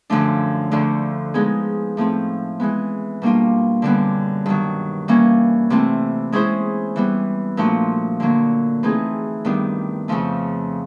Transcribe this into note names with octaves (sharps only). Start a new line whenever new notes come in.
F#2 D3 F3 A3 D4
D2 D3 F3
F3 G#3 B3 D#4 G#4
A2 F3 A3 C4
E3 G#3 B3
B2 G3 A#3 D4 F4
F#2 D3 G3 B3 D4
G2 D#3 F#3
E3 G3 A#3 C#4
C3 E3 A3 C4
G#3 C#4 E4 G#4 C5
E3 G3 B3
A#2 F3 A3 D4 F#4
D3 F#3 A#3
E3 A3 C4 D#4 G#4
G2 D#3 G3 B3 D4
F2 C#3 F3 A3